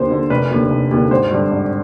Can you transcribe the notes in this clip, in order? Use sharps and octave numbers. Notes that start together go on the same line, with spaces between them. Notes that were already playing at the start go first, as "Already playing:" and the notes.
Already playing: D#2 D3 C5
D3
F1 B4
D#2 D3
F1
D#2 D3
G#1 C5
G2 D3
G#1